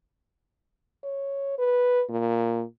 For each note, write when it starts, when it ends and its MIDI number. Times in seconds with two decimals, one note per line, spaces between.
1.03 1.58 73
1.58 2.04 71
2.09 2.64 46